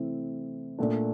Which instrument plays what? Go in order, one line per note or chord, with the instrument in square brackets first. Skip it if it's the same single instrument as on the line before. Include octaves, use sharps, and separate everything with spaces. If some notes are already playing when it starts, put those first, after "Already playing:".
Already playing: [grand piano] C3 E3 A3 C4 E4
A#2 A3 D4